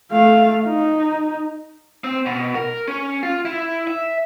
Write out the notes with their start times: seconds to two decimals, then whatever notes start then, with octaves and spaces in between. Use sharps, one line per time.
0.12 A3 F5
0.67 D#4
2.04 C4
2.26 B2
2.55 A#4
2.88 C#4
3.23 F4
3.45 E4
3.87 E5